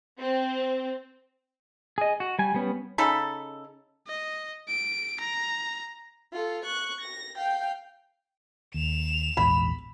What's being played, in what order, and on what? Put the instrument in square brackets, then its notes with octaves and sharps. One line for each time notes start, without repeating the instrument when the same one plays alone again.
[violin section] C4
[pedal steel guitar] G#4 D#5
F#4
G3 G#5
G3 B3 C#4
[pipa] C#3 D#4 A4 B5
[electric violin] D#5
D7
A#5
[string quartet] F4 A4
C#6 F#6
A#6
F5 G5
[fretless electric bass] D#2 [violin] E7 F7
[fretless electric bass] A#1 E2 G#2 [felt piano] B5